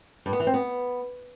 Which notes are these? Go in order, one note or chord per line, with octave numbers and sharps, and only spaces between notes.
G2
B3
E3
C4
B3